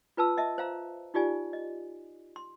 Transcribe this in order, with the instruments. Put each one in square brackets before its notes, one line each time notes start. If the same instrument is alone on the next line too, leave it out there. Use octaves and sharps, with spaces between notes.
[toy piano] F4 B4 A5 E6
D#5 E5 A5
C5 F5 A#5
D#4 F4 G4 D5 G#5
D#5
C6